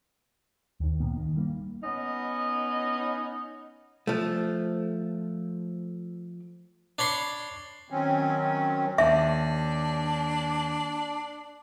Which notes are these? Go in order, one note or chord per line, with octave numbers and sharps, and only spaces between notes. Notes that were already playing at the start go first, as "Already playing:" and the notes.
D#2 D#3
C#2 A#2 A#3 B3
D#3
G3 A3 A#3
B3 C#4 D#4 D#5
F3 A3
D4 C#5 B5 C6
D#3 F#3 C4 C#4
D#2 D4 E5